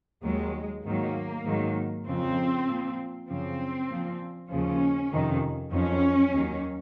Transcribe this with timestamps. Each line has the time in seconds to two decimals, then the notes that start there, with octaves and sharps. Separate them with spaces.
0.23 D#2 D#3 F#3 G#3
0.84 G#2 D#3 F#3 A#3
1.45 G#2 D#3 F#3
2.06 F2 C#3 F3 C4
2.67 A#2 F3
3.28 F#2 C#3 F3 C4
3.89 A#2 F3
4.50 D#2 C#3 F3 C#4
5.11 F2 C3 D#3
5.72 F2 D#3 F#3 C#4
6.33 D#2 D#3 F#3